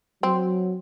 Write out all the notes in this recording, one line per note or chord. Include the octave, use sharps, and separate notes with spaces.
F#3 C4